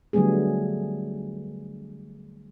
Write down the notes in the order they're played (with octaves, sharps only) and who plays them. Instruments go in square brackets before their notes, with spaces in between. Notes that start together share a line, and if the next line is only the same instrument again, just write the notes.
[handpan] D3 F#3 G3 A3 B3 G#4